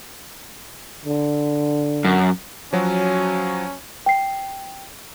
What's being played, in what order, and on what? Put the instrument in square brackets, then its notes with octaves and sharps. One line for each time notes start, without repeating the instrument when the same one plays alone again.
[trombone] D3
[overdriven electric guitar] F#2
[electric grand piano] F3 F#3 F#4 [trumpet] C#4
[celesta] G5 C7